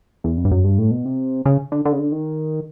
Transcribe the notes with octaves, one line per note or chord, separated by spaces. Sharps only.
E2
F2
G2
F#2
G2
A2
B2
C3
C#3
D3
D3
C#3
D3
D#3